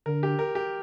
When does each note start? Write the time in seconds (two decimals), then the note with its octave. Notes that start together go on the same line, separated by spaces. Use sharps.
0.06 D3 A#4
0.23 G4
0.39 A#4
0.55 G4